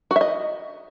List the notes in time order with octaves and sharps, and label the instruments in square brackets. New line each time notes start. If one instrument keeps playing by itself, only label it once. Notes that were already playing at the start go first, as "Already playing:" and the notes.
[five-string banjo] F#4
E5
D#5